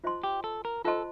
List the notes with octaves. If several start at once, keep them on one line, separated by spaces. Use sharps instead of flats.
F4 C5 D#5 A5 C6
G4
A4
A#4
F4 A4 C5 D#5 A5 C6